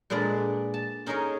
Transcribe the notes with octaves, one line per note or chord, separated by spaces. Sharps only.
A#2 G#3 D4 B4 D5 A#5
A5
C#4 D#4 G#4 A#4 C#5 D#5